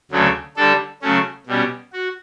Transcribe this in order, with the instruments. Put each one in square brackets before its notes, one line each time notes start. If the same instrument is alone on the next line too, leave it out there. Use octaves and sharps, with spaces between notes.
[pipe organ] D2 C#3 F#3 A3
D3 G3 D4 A4
C#3 F#3 A3 C#4
B2 G3 C#4
F#4